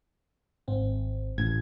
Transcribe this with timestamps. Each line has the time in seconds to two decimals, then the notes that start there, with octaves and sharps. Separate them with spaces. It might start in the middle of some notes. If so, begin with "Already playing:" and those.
0.68 G#1 C4
1.38 A1 G#6